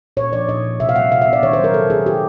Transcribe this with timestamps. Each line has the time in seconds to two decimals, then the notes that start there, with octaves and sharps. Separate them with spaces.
0.17 A#2 C#5
0.33 F3 D5
0.49 A#2 D#5
0.64 F3
0.80 C3 E5
0.89 F5
0.96 G3 F#5
1.11 C3 F5
1.22 E5
1.28 B3
1.33 D5
1.43 D#3 C#5
1.53 C5
1.59 F#3
1.64 A#4
1.74 C3 A4
1.90 D#3 G#4
2.06 D#4 G4